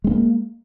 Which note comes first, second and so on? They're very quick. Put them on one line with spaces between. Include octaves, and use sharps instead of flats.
G#3 C4 A#3